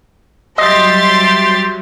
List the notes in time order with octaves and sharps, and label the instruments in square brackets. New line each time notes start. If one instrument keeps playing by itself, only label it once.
[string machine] F#3 G3 [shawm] G4 [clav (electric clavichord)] D#5 [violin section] E5 C6 A6